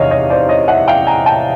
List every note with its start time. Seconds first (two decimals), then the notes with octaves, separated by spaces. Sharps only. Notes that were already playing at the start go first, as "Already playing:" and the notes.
Already playing: E2 C3 D#3 C#5 D#5 F5
0.11 C#5 D#5
0.30 C5 D5
0.49 C#5 D#5
0.68 E5 F#5
0.88 F5 G5
1.07 G#5 A#5
1.26 G5 A5